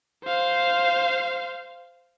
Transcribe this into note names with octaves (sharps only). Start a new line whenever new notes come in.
C5 F5